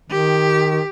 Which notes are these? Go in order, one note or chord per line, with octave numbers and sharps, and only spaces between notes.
D#3 G4